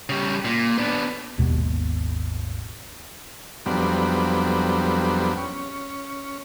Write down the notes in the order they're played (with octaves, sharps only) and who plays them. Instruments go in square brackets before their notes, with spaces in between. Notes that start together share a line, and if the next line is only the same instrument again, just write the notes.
[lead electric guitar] C#3 G3
A#2
B3 D4
[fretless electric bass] G#1 D#2 B2 G#3
[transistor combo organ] F2 F#3 G3 B3 C4 D4
C#4